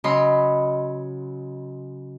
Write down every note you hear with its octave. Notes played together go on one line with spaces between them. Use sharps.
C#3 F#3 D#5 B5 C6